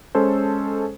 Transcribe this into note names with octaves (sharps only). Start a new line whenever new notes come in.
G#3 C#4 A4 C5